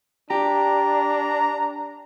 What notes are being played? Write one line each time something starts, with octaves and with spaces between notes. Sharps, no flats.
D4 G4 A#5